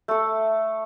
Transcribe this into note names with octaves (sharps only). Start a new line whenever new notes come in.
A3 A4